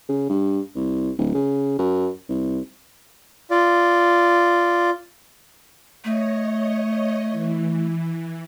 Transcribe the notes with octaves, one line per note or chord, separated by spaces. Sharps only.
C#3
G2
C2
D1
C#3
F#2
C2
F4 D5
A3 C#5 D#5
E3